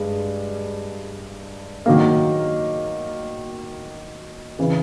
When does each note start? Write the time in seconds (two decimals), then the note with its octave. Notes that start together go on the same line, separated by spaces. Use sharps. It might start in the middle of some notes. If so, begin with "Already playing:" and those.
Already playing: G2 G#3
1.86 D#3 F#3 A#3
4.59 C#3 E3